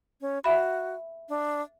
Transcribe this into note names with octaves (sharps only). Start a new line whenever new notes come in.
C#4
F#4 E5 B5
D4